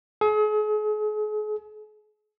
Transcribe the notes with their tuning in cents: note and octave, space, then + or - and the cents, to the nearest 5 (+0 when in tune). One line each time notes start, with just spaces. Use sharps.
G#4 +40